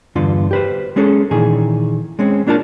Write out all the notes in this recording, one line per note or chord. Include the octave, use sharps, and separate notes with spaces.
E2 G2 D3 F4 C6
G4 B4 C5
G#3 C#4 G#4 A4
A#2 D#3 E3 G#4
G#3 C4 C#4
A#3 D4 F4 A#4 A5